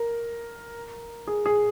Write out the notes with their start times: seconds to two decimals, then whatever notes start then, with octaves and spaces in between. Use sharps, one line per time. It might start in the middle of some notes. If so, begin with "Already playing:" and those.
Already playing: A#4
1.27 G#4
1.46 G#4